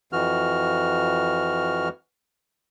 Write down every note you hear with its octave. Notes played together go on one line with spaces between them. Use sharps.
F2 E3 F#4 F6